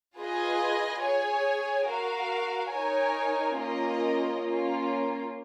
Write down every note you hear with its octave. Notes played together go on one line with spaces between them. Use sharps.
F4 G#4 B4 D#5 G#5
G#4 C#5 G#5
F#4 A#4 F5
D#4 A#4 C#5 G#5
A#3 C#4 F4 A#4 D#5
A#3 C#4 F4